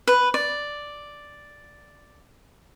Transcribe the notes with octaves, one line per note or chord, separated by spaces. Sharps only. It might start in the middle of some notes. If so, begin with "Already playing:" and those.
B4
D5